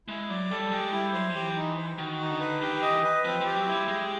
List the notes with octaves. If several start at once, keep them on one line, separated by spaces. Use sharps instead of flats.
G#3 E4
F#3 D5
G3 A4
G#3 G4
G3 E4
F#3 C5
F3
E3 G4
D#4
C5
D#3 F#4
D#4
D3
B4
D#3 G4
E3 D#5
B4
F3 C4
F3 G4
F#3
G3 E4
G#3 G4